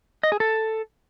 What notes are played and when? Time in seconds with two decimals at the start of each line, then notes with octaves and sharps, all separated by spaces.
0.23 D#5
0.32 G#4
0.40 A4